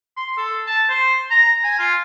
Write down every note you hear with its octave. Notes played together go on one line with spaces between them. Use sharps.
C6
A4
A5
C5
A#5
G#5
F4